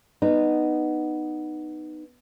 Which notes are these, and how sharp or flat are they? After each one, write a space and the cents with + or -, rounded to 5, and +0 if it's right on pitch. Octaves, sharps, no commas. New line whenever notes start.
B3 +0 D#4 -20